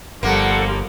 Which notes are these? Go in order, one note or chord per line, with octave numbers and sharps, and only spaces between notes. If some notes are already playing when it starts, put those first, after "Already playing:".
G1 F3 G3 A#3 A4 F#5